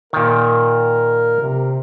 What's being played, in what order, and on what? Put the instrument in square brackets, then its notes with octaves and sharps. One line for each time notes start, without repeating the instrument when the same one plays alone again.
[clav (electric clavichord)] A#2 D#3 [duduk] A#4
[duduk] C3